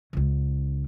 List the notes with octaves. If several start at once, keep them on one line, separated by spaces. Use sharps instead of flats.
C#2 C#3